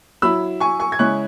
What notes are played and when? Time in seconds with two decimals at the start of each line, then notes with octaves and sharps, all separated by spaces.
0.22 F#3 E4 B5 E6
0.60 G#5 C#6
0.80 G#5 C#6
0.92 G#6
0.99 C#3 G#3 C#4 E4 C#6 F#6